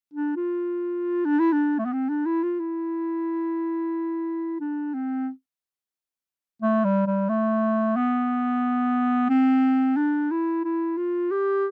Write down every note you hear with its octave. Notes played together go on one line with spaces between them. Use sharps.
D4
F4
D4
E4
D4
A3
B3
C4
D4
E4
F4
E4
D4
C4
A3
G3
G3
A3
B3
C4
D4
E4
E4
F4
G4